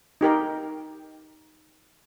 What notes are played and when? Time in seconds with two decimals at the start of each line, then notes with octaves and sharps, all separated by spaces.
0.21 D#4 G4 A#4 G5